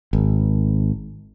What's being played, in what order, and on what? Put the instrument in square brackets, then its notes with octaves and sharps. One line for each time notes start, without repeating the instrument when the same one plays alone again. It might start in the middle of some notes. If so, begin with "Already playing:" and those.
[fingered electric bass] G#1